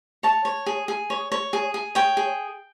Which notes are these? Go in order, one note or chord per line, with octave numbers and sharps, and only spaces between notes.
C#5 A5
C#5
G#4
G#4
C#5
C#5
G#4
G#4
C#5 G5
G#4